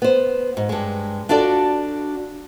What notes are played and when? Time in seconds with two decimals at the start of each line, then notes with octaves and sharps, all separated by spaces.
0.02 B3 C5
0.57 G#2
0.69 G2 G#3
1.29 D4 F4 F#4 A4 D5